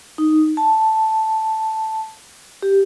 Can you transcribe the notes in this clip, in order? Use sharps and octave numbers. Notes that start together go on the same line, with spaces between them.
D#4
A5
G4